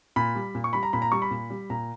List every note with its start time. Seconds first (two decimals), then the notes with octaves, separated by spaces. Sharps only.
0.16 A#2 B5
0.35 G3
0.55 A#2
0.64 C#6
0.73 G3 B5
0.83 A#5
0.93 A#2 B5
1.02 A#5
1.12 G3 C#6
1.22 B5
1.31 A#2
1.50 G3
1.70 A#2 A#5